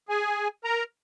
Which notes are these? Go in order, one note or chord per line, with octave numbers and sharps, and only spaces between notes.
G#4 G#5
A#4 A#5